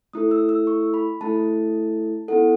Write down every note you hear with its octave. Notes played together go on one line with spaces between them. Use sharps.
A3 E4 A4 D#6
E6
E6
C#6
B5
A3 E4 A4 A5
B3 E4 A4 F#5